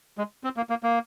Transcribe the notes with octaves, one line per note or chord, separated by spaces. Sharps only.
G#3
C4
A#3
A#3
A#3